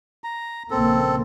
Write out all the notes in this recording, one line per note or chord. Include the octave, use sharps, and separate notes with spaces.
A#5
A#1 C#3 A#3 C4 A4